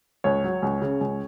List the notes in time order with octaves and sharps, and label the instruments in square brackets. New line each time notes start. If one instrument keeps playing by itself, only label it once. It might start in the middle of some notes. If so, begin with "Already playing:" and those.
[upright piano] C#2 C#5
F#3
C#2
C#3
C#2